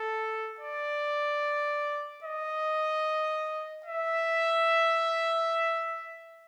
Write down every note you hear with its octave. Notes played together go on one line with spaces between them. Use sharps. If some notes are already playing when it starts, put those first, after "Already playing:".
Already playing: A4
D5
D#5
E5